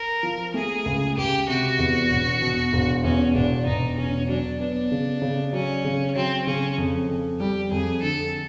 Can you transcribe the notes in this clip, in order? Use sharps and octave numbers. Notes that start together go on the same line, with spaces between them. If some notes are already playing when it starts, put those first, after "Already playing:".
Already playing: A#4
F3
A3 G#4
C#2
C#2 G4
C3 F#4
E2
E1
B2
E1
E2 C#4
E1 D4
E1 D#4
E1 C#4
F#3 D4
B3 D4
C#3
C#3
F#3 C#4
C#3
F#3 C4
C#3 C#4
F2
F2
G3 G4
F2 G#4
D3 A4